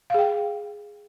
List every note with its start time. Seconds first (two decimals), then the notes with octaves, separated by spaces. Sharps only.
0.10 F5
0.14 G#4
0.19 G5